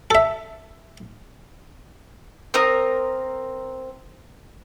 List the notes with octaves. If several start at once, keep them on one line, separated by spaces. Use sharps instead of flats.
A4 E5
C4 A#4 D#6